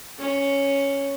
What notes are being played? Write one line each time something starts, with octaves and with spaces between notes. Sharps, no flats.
C#4